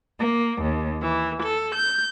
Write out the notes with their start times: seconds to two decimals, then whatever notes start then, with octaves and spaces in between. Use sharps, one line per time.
0.20 A#3
0.60 D#2
1.02 E3
1.43 A4
1.74 G6